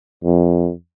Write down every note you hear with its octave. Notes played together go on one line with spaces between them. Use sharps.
F2